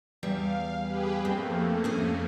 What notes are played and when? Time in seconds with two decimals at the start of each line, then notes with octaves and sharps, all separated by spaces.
0.23 E2 G3 E5 F5
0.79 G4 G#4 B4
1.25 F2 A3 A#3 C4
1.84 C#4 G#4 G#5